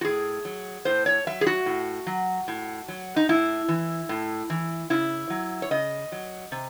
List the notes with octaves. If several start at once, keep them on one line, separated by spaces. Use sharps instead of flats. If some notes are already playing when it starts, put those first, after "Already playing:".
F#4
A2 G#4
F#3
A2 C5
C#5
F#3 E5
G#4
F#4
A2
F#3
A2
F#3
D#4
A2 E4
E3
A2
E3
C#3 E4
F#3
C#5
C#3 D#5
F#3
C3